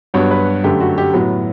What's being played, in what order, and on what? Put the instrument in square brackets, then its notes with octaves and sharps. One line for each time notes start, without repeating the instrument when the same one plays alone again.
[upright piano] G2 F#3 B3 C#5
B4
F#2 D3 A3 G4
F#4
G4
A2 F#3 B3